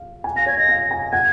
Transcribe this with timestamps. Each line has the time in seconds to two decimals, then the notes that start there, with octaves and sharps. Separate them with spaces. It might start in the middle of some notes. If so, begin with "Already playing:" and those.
Already playing: F5
0.24 G#5
0.36 F5 A#6
0.46 C#5 G#6
0.57 D#5 A#6
0.69 F5
0.91 G#5
1.12 F#5 G#6